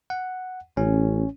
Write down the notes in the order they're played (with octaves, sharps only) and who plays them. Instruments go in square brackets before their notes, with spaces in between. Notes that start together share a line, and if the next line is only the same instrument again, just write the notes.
[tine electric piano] F#5
[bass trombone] A1 [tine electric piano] C#4